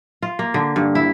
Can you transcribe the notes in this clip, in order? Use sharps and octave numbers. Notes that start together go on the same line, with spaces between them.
F4
A#3
D3
G2
E4